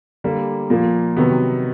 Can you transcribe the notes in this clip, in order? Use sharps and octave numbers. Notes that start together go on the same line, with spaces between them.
D3 G3 A#3
A#2 F3 A#3
C3 D#3 F#3 B3